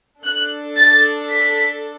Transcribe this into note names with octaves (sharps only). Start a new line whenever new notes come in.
D4 A4 F#6
A6
B6